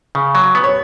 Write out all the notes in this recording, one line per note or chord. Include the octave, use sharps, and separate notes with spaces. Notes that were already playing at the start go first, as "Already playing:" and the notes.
C#3
F#3
B3
C#5